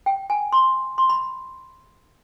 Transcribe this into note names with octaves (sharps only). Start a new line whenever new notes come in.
G5
G#5
C6
C6
B5